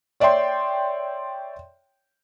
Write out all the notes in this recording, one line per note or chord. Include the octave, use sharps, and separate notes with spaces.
C#5 D5 E5 G5 C6